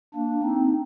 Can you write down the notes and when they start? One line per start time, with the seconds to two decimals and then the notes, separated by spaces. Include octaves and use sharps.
0.14 A#3 D4
0.43 C4 D#4